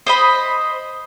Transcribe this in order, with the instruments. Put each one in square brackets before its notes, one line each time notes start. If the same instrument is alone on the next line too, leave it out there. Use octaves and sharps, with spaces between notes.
[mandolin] C5 D#5 B5